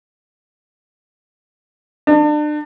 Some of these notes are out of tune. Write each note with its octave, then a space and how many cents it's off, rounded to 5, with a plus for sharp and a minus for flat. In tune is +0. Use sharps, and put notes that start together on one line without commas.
D4 +35